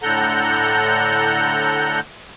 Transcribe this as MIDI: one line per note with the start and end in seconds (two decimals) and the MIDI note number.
0.03 2.00 45
0.03 2.00 50
0.03 2.00 69
0.03 2.00 78
0.03 2.00 82
0.03 2.00 91